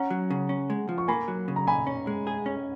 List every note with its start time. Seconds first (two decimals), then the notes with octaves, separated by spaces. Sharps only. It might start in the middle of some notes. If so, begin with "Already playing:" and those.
Already playing: C#4 F#5 A#5
0.11 F#3
0.30 C#3
0.49 C#4
0.70 G#3
0.89 F3
0.98 C#6
1.08 A#3 G#5 B5
1.28 F#3
1.48 C#3
1.56 A#5
1.67 A#2 G#5 B5
1.87 C#4
2.07 G#3
2.27 G#4
2.46 C#4